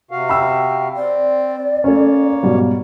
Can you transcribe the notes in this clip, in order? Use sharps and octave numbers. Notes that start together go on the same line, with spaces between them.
C3 F#4 F5
G5 B5 E6
C4 D5
A3 A#3 C#4 C#5
G#2 B2 G3